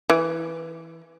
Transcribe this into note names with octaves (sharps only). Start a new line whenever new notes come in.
E3